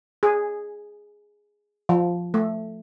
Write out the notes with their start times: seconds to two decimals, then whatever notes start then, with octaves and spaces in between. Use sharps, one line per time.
0.23 G#4
1.89 F3
2.34 A3